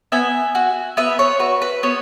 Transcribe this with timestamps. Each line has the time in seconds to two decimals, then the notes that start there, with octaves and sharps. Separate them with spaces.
0.12 B3 E5 G#5
0.55 F#4
0.97 B3 B4 E5
1.19 C#5
1.40 F#4 B4
1.62 B4
1.83 B3 C#5